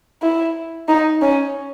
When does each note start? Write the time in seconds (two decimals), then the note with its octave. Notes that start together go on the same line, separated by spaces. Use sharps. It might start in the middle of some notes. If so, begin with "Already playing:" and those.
0.22 E4
0.88 D#4
1.22 C#4